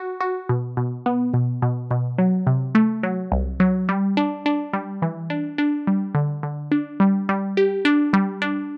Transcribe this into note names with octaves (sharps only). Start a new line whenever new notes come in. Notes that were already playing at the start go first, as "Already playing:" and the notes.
Already playing: F#4
F#4
B2
B2
B3
B2
B2
B2
F#3
C3
A3
F#3
C2
F#3
G3
D4
D4
G3
E3
D4
D4
G3
D3
D3
D4
G3
G3
G4
D4
G3
D4